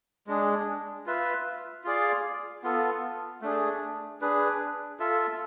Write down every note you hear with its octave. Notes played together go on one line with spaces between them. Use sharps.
G#3 D4 G#4
F4 B4 E5
F4 G#4 D5 F5
B3 F4 A4
A3 D4 G#4
D4 G#4 B4
F4 A4 E5